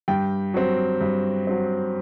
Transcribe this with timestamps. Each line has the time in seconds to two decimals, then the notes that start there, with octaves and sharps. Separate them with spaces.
0.08 G2 G5
0.54 F#3 C4
1.01 G2
1.47 F#3 C4